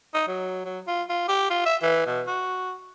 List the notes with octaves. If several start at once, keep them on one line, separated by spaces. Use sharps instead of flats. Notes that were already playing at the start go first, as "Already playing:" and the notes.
D#4
F#3
F#3
F4
F4
G4
F4
E5
E3
B2
F#4